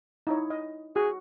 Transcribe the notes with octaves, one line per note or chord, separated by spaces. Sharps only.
D#4 E4 C#5
D#5
F#4 G#4